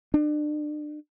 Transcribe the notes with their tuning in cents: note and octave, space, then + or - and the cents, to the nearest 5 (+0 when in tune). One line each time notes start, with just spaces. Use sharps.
D4 +35